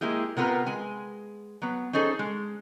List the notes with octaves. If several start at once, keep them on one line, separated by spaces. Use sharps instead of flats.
G#3 A#3 E4 G4 G#4
C3 B3 F4 A#4 B4
G#3 G#5
F#3 B3
C#4 D#4 G#4 A4 C5
G#3